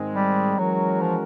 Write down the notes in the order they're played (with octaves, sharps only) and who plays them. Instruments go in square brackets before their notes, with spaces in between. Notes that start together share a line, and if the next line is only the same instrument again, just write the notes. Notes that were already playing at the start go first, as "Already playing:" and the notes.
Already playing: [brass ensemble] G#2 D#3 G#3 C4
[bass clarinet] G3
[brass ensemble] E3 G#3 C#4 F#4 A#4 [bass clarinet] F#3
[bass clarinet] F3